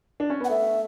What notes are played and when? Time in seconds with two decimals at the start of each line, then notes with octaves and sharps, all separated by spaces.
0.20 D4
0.30 C#4
0.40 B3 F#5
0.50 A3 E5